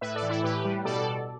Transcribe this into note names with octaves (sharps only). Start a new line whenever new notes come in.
A2 B4 E5
A4 D5
E3
E4 A4
A2 G4 B4
G3
B2 A4 D5